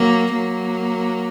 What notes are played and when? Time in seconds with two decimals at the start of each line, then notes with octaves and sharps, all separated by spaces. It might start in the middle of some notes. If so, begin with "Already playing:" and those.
Already playing: F#3 A#3
0.33 F#3 A#3